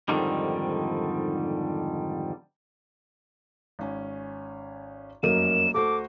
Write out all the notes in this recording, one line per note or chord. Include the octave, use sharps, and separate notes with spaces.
F2 G#2 D3 D#3 G3
G#1 C#4 G#5
F1 F#2 A#3 C#4 D#4 D#7 E7
D2 F#4 A4 C5 D6